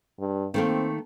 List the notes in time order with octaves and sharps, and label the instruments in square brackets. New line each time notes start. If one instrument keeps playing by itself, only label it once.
[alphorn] G2
[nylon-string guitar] D#3 A3 A#3 [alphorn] C4